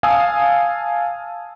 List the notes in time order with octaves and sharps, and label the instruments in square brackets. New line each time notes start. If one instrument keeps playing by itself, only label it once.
[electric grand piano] F5 G#5 A5 D#6 E6